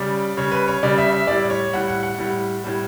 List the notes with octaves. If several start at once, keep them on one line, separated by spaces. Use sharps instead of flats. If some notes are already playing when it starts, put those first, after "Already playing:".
Already playing: C#3 G3 D5
C#3 G3 C#5
B4
C#5
C#3 G3 D5
E5
E5
A2 G3 D5
C#5
A2 G3 F#5
F#5
F#5
A2 G3
A2 G3